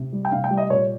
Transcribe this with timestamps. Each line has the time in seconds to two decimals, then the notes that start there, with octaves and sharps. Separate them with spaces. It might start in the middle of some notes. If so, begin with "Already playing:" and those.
Already playing: C3
0.13 G3
0.25 G5
0.32 C3 F5
0.44 G5
0.50 G3
0.57 D#5
0.70 A#2 C#5